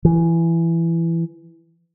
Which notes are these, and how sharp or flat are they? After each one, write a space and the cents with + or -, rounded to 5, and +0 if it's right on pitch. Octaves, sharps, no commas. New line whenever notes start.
E3 +15